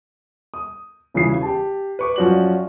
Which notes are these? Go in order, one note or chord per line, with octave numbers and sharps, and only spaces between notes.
D#6
E1 C#3 E3 F4 D#6 C7
G4 A5
B4 C#6 D6
F#2 F3 C#4 F#4 D5 F#7